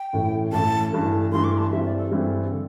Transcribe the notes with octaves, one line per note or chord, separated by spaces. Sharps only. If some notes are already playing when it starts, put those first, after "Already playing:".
Already playing: G5
A1 A2 E3 A3
A1 A2 E3 A3 A5
G2 E3 A3 A5
G2 E3 A3 C6
D6
C6
A5
G2 E3 G3 C4 E4 E5
D5
A4
G2 E3 G3 C4 E4
D3